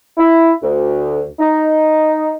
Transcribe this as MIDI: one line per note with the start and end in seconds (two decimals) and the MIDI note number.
0.17 0.53 64
0.63 1.24 38
1.39 2.33 63